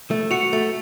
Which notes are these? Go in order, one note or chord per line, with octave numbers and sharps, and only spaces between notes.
A3
F#4 C#7 F7
A3